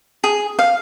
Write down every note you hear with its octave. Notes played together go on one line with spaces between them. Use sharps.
G#4
F5